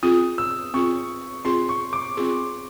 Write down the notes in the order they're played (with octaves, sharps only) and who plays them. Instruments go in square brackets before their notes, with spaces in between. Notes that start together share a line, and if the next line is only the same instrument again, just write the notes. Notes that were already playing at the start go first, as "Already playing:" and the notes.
[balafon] C4 F4 G#4 [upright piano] D#6
[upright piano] E6
[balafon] C4 F4 G#4 [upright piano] C#6
[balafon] C4 F4 G#4 [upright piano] C6
[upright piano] C#6
D6
[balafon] C4 F4 G#4